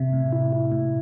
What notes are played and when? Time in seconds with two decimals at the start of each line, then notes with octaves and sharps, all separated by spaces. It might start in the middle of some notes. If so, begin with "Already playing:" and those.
Already playing: C3 E5
0.13 A2
0.33 E4
0.52 E4
0.72 A2